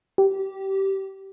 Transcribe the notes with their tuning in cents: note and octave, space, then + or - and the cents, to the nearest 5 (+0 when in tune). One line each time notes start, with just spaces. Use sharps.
G4 -20